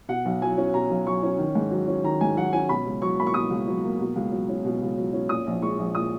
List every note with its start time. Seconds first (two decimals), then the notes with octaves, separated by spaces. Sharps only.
0.08 B2 F#5
0.25 B1
0.42 F#3 G#5
0.58 C#4
0.74 B2 A#5
0.90 B1
1.06 F#3 C#6
1.23 C#4
1.39 D#3
1.55 G#2
1.71 F#3
1.88 C#4
2.04 D#3 A#5
2.21 G#2 G#5
2.37 F#3 F#5
2.53 C#4 G#5
2.69 B2 B5
2.86 C#2
3.02 F#3 C#6
3.19 A#3 B5
3.27 C#6
3.34 B2 D#6
3.50 C#2
3.67 F#3
3.83 A#3
4.00 B2
4.16 C#2
4.32 F#3
4.49 C#4
4.65 B2
4.82 C#2
4.97 F#3
5.13 C#4
5.29 A#2 D#6
5.47 A#1
5.62 G#3 C#6
5.79 A#1
5.95 A#2 D#6